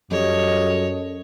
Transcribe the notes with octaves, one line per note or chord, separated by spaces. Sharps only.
F#2 G3 A4 C#5 D#5